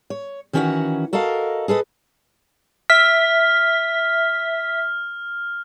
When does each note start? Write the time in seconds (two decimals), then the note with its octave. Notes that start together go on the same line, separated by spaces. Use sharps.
0.10 C#5
0.53 D#3 E3 C#4 F#4 C5 F#5
1.13 F#4 A4 A#4 D#5 F5
1.68 G#4 A4 B4 D#5
2.90 E5 F6 B6